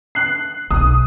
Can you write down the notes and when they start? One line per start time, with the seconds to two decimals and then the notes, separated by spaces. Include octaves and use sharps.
0.15 F#6 C7
0.71 B1 D#6